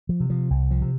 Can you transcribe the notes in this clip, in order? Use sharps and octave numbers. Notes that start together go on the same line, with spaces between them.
F3
C3
F3
C2
F3
C3